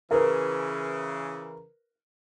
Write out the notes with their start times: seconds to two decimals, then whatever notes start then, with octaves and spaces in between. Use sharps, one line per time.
0.11 C#3 E3 A#4 B4